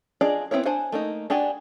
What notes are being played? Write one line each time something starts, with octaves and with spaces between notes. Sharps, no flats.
D4 F4 G#4 D5 D#5
B3 C4 E4 A#4 C#5
D4 C5 F#5 G#5
A3 A#3 D#4
D4 F#4 G4 D5 G#5